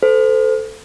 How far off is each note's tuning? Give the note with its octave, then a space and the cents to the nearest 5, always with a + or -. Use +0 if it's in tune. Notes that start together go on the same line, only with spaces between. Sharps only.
A4 +0 C5 -30